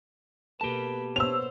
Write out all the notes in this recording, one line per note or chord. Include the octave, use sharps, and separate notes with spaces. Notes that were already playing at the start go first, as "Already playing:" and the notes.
B2 A#3 G4 A4 B4 A5
B3 C5 C#5 E6 F7